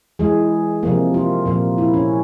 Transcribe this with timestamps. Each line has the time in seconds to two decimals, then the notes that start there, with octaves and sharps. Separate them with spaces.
0.19 E3 G#3 G#4
0.83 C3 F3 A#3
1.14 F4
1.46 A#2 F3 A#3
1.78 E4
1.94 C#4